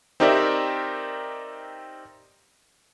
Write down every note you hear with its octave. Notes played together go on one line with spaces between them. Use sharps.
C4 D#4 G4 A#4 D5 E5